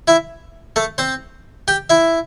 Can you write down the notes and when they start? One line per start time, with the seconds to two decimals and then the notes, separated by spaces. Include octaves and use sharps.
0.08 E4 E5
0.76 A3 A4
0.98 C4 C5
1.68 G4 G5
1.90 E4 E5